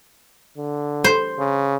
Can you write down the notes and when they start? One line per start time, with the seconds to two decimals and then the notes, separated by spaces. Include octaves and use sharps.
0.58 D3
1.04 C5
1.39 C#3